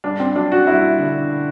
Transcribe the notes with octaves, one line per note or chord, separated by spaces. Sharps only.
G2 D4
C4
F#3 D4
F#4
G2 E4
D3